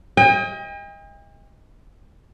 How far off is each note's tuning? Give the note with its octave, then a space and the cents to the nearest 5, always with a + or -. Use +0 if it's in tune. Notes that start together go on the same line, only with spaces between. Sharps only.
D#5 +30 G5 +45